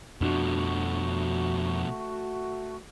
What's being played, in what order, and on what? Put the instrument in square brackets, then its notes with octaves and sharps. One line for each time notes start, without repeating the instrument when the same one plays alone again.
[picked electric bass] F2 C#4 D4 [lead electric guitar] B2 F3 [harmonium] A3 F#4